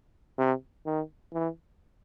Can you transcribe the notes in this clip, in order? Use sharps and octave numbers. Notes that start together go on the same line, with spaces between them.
C3
D#3
E3